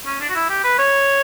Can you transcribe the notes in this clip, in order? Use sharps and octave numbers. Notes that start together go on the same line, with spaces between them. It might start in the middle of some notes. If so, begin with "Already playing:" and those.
C#4
D4
F#4
E4
G4
B4
C#5